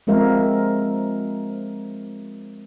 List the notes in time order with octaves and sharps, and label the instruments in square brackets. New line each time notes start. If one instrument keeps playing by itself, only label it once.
[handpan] F3 G#3 C4 A#4 E5 F5